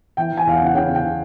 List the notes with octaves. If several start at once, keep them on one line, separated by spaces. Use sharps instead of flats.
E3 G5
E3 G#5
E2 F5
F#5
C#3
F#5
C#3 G5
C#3
G5
C#3